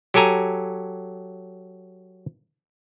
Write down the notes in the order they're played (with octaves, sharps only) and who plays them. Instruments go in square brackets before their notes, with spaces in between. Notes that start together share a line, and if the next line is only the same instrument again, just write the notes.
[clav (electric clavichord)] F#3 G4 A4 G#5 A#5